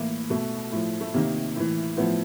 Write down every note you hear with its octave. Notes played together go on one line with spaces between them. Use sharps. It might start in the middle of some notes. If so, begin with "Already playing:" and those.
Already playing: A2 E3 A#3
B2 A3
A2 F3
A3
C3 D#3 A#3
A2 E3
A2 F3 B3